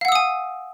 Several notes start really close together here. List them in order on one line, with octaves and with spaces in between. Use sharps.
F5 F#5 E6 D#6 G#5